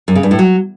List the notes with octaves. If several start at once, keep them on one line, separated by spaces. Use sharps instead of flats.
F#2
C#3
G2
A2
F#3